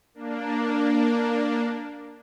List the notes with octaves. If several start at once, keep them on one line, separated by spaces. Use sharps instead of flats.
A#3 D4